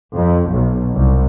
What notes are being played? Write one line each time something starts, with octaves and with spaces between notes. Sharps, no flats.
F2
B1
C2